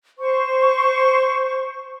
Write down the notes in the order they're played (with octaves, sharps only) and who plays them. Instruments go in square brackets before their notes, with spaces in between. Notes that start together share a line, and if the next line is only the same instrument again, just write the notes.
[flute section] C5 C#6